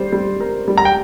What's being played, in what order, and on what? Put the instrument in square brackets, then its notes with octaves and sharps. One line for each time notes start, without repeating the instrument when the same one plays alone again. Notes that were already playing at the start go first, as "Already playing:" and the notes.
Already playing: [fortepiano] G3 [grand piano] C5
[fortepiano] G3
A#4
G3
[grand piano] A#5
G5